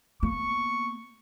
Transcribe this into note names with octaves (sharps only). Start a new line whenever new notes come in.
A#3 B3 C#6